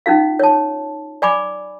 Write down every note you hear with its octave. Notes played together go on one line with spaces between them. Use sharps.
C#4 D#4 F4 F5
C#5 A5
D5 G#5 B5 D6